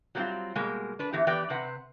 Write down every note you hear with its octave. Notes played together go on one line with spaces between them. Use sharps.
F#3 G3 A3 A#3 C4 F4
B2 G3 G#3 A#3
D4 B4
E2 E3 G4
E3 B3 G4 B4 D5 G5
C3 C4 B4 F#5